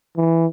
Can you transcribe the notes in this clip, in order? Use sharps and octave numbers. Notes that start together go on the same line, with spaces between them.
E3